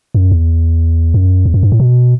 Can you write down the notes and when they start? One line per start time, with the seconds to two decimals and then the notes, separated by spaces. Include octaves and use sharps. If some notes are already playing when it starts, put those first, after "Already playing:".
0.15 F#2
0.31 E2
1.14 F#2
1.45 E2
1.54 F#2
1.63 G2
1.72 A2
1.80 B2